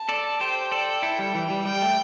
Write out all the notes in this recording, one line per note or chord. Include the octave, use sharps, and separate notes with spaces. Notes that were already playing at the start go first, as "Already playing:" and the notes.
Already playing: A5
A4 D5
G4 C5 G5
A4 D5
E4 A4
G3
E3
G3
G3 G5
A3